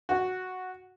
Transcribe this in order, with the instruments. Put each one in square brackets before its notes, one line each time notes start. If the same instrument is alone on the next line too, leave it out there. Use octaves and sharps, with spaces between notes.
[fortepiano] F#4